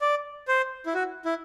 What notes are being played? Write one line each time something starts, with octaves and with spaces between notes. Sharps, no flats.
D5
C5
E4
F#4
E4